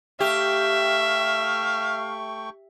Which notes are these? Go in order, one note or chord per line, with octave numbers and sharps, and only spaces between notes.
A3 G4 E5 F5 G5 C#6